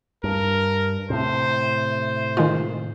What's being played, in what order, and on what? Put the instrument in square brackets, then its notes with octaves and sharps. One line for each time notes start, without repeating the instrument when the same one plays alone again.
[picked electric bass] G2 [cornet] A#4
[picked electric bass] A2 C3 [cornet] C5
[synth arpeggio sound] D#3 G#3 F4